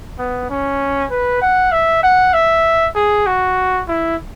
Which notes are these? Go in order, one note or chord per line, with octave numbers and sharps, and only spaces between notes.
B3
C#4
B4
F#5
E5
F#5
E5
G#4
F#4
E4